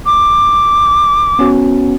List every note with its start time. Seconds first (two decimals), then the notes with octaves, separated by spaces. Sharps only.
0.06 D6
1.39 B3 C#4 F#4